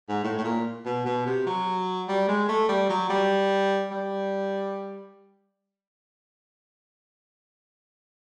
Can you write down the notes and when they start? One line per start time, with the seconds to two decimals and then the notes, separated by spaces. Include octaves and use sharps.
0.09 G#2
0.24 A2
0.38 A2
0.44 A#2
0.86 B2
1.05 B2
1.26 C3
1.46 F#3
2.08 G3
2.28 G#3
2.48 A3
2.68 G3
2.89 F#3
3.09 G3
3.91 G3